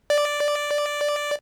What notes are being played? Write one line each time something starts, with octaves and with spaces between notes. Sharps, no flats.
D5